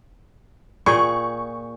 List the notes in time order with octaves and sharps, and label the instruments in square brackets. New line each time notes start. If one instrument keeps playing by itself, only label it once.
[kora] A#2 G#4 G5 [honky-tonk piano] C#6